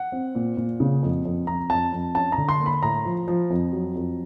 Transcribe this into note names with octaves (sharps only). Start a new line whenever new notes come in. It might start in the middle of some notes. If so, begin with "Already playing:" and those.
Already playing: F#5
C4
A#2
A#2
C#3
F2
F2
F2 A#5
F2 A5
F2
C#4 A5
A#5
D3
C6
A#3
B5
A2 A#5
F3
F3
F2
F#3
F2